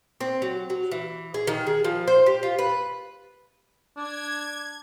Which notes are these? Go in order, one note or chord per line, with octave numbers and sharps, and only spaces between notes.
C4
F#3
F#3
E3
G#4
D#3
G#4
F3
C5
G4
F4
B4
D4 G#6